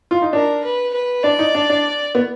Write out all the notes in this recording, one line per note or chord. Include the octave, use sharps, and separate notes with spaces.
F4
D#4
D4 A#4
B4
B4
D4 D5
D#4
D4
D4
B3